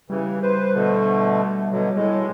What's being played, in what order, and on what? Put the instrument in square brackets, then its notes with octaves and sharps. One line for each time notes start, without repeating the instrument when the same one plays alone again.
[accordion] C#3 E3 [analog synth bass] G3
[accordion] B4 C5
B2 D3 A3
B2 D3 F#3
A2 G#3